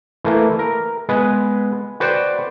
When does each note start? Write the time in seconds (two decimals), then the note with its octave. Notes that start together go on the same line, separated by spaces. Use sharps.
0.24 E3 A3 A#3
0.59 A#4
1.09 G#3 B3 B4
2.00 F#4 B4 C5 D5 F#5 G5